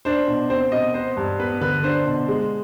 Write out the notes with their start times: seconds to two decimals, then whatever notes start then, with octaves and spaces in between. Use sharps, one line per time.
0.05 D4 C5
0.27 B2
0.50 C4 C5
0.72 B2 D#5
0.94 B3 C5
1.17 G2
1.40 B3 B4
1.61 D3 B4
1.84 D4 C5
2.06 B2
2.28 G#3